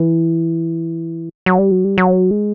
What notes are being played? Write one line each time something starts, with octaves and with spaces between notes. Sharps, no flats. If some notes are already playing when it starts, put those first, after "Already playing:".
Already playing: E3
F#3
G3
F#3
G3
F#3
G#3